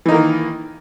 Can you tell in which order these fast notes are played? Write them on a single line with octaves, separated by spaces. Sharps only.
E3 D#4 A#3 D#3